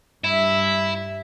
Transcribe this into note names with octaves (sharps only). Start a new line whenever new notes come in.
G2 E4 E5